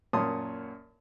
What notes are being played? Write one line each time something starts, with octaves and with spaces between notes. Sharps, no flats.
F#2 A#2 C#5 A5 C6 D#6